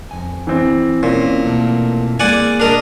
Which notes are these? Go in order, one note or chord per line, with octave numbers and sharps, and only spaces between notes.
F2 G#5
E3 C4
A#2 C#4
B2 A3 A#3
G#3 A#3 D5 F#5 G#5
D4 A#4 D#5